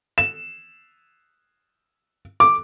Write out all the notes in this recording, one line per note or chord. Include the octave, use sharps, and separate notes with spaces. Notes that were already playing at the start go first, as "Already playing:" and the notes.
E7
D6